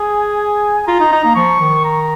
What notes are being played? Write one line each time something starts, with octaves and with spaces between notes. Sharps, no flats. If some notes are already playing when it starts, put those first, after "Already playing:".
Already playing: G#4 G#5
F4 A#5
D#4
D#4
A#3
F3 C#6
D#3
A#5